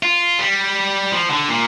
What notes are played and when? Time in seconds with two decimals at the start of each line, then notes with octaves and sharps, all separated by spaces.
0.03 F4
0.39 G3
1.12 F3
1.30 D3
1.48 A#2